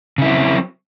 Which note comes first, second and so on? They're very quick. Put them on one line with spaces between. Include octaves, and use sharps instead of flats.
C#3 E4 C4 F#3